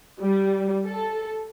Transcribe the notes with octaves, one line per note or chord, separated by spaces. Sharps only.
G3
A4